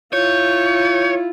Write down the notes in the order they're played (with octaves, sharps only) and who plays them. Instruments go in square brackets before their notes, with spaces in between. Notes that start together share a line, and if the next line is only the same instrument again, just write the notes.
[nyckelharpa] E4 F4 [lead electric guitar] C#5 [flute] G6